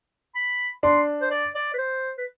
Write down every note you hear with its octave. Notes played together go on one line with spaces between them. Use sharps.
B5
D4 C6
C5
D5
D5
B4
C5
B4